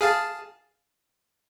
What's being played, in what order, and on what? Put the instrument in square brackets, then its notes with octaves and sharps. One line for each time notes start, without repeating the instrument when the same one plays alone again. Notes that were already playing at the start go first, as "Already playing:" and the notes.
[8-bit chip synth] G#4 F5 A5